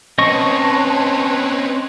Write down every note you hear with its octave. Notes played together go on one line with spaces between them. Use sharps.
C4 C#4 B4 C#5 D#5 A5 C#6